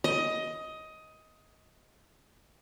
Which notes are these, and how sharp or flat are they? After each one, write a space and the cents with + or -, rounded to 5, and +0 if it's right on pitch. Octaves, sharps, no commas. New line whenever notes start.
D#5 +15